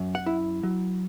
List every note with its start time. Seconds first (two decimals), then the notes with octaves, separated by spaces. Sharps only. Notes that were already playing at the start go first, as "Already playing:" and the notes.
Already playing: F#2
0.15 F#5
0.26 E4
0.63 F#3